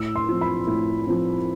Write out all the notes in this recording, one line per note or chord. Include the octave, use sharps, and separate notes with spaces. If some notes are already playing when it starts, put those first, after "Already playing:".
Already playing: A2 E6
C6
F3 C4 E4
B5
A2
F3 C4 E4